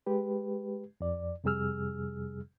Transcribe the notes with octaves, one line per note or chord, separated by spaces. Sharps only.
G#3 G4 B4
F2 D5
F2 C3 G3 G#4 E6 F6